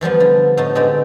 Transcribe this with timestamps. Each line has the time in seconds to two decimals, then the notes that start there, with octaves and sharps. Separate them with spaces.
0.01 E3 F3 G3 B3
0.20 D3
0.57 A2 B3 D#4 A5
0.75 D3 G#3 C4 D#4 G4